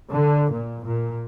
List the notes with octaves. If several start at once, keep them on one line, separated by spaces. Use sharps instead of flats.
D3
A#2
A#2